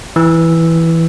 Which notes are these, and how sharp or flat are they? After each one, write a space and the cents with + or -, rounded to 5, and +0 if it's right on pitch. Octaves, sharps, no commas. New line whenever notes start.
E3 +0 E6 +0